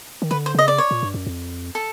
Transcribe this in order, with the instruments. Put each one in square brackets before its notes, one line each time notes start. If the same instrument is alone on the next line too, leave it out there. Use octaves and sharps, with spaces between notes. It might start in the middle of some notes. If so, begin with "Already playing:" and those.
[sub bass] D#3
[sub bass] D3 [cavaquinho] B4
[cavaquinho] C5
[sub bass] C#3 [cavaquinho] D#5
[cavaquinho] D5
C#5
[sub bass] A#2
G2
F#2
F2
[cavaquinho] A4